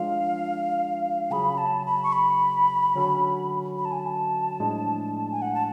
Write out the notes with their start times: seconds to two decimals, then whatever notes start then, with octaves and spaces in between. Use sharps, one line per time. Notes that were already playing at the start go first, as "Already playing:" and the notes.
Already playing: F3 G#3 D4 F4 F5
1.30 C#3 F#3 C#4 G#4 B5
1.58 A5
1.86 B5
2.03 C#6
2.13 B5
2.95 D3 F#3 C#4 F#4 A4
3.78 B5
3.85 A5
3.92 G#5
3.99 A5
4.60 A2 F3 G#3 D4
5.31 G#5
5.42 F#5
5.55 A5